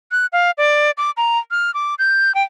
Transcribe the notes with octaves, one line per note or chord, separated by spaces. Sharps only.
F#6
F5
D5
D6
A#5
F6
D6
G6
G5